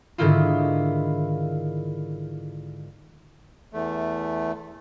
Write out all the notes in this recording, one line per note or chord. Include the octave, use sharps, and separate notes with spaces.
G#2 D3 D#3 E4 F4
E2 A3